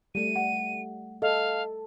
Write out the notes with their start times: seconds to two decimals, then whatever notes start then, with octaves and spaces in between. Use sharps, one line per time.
0.15 G3 A3 D#7
0.36 F#5
1.22 A4 D#5 F5